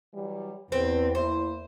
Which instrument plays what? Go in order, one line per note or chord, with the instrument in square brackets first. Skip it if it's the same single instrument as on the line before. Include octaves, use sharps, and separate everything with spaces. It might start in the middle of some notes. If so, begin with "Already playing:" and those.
[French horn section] E3 F#3 G3
[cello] E2 [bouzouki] C4 [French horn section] E4 G4 B4
[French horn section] A#3 E4 [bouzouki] C5